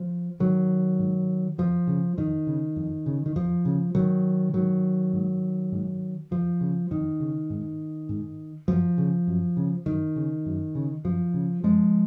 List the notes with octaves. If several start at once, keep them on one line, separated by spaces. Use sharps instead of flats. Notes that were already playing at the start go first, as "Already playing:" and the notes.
Already playing: F3
G#2 D#3 F#3
G#2
F2 F3
C#3
F2 D#3
C#3
F2
C#3
D#3
F2 F3
C#3
G#2 D#3 F#3
G#2 D#3 F#3
G#2
G#2
F2 F3
C#3
F2 D#3
C#3
G#2
G#2
F#2 F3
C#3
F#2
C#3
F#2 D#3
C#3
F#2
C#3
F#2 F3
C#3
F#2 F3 G#3